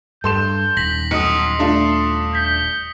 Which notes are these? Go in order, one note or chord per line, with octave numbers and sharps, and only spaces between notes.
G2 A4 C6 G6 E7
D#1 A#6 B6 F#7
B1 C6 D#6 C#7
A3 D4 F4
G6 B6